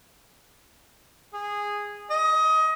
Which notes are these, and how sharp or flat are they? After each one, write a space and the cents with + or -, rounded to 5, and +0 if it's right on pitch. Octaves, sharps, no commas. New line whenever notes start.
G#4 -10
D#5 +25